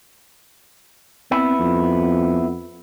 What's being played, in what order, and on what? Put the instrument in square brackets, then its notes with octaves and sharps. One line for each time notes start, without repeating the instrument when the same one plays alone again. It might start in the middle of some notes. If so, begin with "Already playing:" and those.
[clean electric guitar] B3 E4 [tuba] C4
[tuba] F2